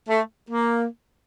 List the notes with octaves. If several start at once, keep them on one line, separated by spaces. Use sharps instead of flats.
A3
A#3